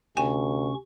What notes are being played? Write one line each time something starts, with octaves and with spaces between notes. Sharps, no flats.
D2 C3 C#4 G5 G#5 C#6